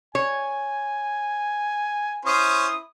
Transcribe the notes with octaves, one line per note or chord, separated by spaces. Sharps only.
C#5 G#5
C#4 E4 C5 C#6 D#6